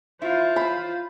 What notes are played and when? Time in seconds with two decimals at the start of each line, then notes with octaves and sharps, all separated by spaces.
0.22 E4 F4 C5
0.56 B5